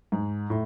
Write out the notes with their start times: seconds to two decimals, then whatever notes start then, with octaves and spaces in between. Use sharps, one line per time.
0.12 G#2
0.50 A2